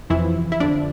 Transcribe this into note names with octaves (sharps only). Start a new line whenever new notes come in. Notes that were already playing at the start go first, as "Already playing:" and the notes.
F2 C3 E3 F3 E4
E4
F2 D3 F3 D4